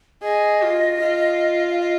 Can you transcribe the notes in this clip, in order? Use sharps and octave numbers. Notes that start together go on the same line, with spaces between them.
G#4 D#5
F4
F4
F5
D#5